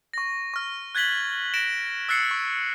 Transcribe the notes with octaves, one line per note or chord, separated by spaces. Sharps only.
C#6 A#6
C#6 F6
F#6 G#6 A6 B6 F#7 G7
A#6 D7 E7
E6 F#6 A6 C7 C#7
C#6